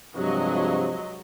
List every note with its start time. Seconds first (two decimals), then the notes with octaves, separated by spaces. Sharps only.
0.16 G2 C3 F3 F#3 G#3 D#5